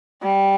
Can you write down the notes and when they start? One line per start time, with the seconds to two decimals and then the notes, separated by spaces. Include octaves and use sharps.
0.23 G3